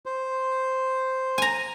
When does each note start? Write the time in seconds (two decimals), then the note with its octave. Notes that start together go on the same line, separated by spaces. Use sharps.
0.06 C5
1.38 G#5 A#5